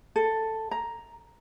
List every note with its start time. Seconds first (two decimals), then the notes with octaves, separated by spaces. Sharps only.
0.16 A4
0.71 A#5